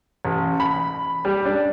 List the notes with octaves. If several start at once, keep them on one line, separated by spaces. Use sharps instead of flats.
A1
B5
G3
D4